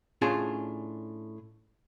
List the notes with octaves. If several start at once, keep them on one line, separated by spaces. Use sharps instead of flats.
A2 C#4 D4 F4 G#4 A5